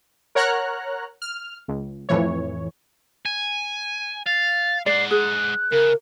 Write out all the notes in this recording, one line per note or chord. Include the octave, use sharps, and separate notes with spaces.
A#4 C#5 F#5 A#5 F6 F#6
F6
C#2
F2 A2 E3 C#5
G#5
F5 A6
G#3 D5 F#5 C7
G#4 F#6
C#3 A#4